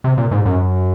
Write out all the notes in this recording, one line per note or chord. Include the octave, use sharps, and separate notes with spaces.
C3
A#2
G#2
F#2